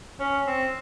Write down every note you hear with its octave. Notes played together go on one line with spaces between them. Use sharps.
C#4
C4